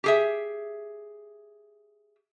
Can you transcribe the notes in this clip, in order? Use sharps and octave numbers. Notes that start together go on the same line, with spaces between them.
G4 G#4 E5